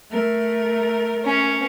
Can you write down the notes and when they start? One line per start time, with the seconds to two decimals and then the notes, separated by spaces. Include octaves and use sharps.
0.10 A3 A#4
1.25 C#4